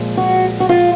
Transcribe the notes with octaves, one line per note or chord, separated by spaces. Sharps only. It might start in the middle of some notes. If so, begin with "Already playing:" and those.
Already playing: A#2 F3 G#3
F#4
F#4
F4